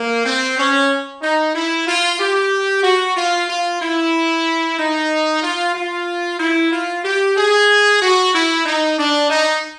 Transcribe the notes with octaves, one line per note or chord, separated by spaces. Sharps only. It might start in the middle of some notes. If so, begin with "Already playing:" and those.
Already playing: A#3
C4
C#4
D#4
E4
F4
G4
F#4
F4
F4
E4
D#4
F4
F4
E4
F4
G4
G#4
F#4
E4
D#4
D4
D#4